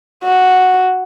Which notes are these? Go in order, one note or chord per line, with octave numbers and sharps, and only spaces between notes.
F#4